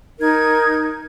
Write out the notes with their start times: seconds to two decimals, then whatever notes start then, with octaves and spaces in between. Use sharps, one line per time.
0.19 D#4 A#4 G#6